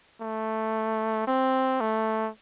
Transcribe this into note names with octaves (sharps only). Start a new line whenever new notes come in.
A3
C4
A3